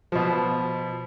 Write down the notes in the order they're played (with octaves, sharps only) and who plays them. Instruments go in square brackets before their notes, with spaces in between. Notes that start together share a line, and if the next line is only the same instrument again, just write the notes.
[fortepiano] B2 F3